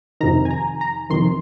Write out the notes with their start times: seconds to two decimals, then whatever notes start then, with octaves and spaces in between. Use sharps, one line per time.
0.21 F2 C3 D#3 A#5
0.45 G#5
0.51 A#5
0.81 A#5
1.10 F2 C3 D#3 C6